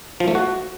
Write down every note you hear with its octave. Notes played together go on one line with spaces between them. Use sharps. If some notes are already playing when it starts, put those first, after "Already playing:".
F3
A3
F#4